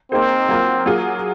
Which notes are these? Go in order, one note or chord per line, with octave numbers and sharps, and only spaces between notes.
A#3 C4 D#4 G#4 C5
F#3 A#3 F4
F#3 A#3 F4 G#4